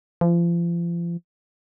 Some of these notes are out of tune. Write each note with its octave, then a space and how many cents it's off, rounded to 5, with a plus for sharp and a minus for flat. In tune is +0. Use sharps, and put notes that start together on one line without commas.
F3 -35